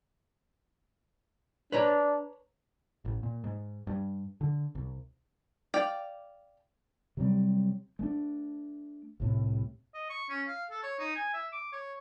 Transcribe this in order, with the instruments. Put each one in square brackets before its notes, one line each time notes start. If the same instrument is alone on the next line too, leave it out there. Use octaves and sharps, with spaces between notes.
[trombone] D4 [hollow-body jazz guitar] B4 C#5 A#5
[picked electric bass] A1
A#2
G#2
G2
D3
C2
[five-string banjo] D5 F5 G5
[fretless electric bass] C3 F#3 G3 C4
G#3 A3 D4
C2 A2 C3
[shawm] D#5
C#6
C#4
F5
A4
C#5
D#4
G#5
E5
D6
C#5